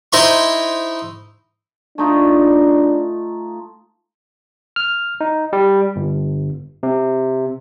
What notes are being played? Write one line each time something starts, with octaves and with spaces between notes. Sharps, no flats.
D#4 E4 C5 D#5 B5 C#6
A3 D4 D#4 F4
F6
D#4
G3
G1
C3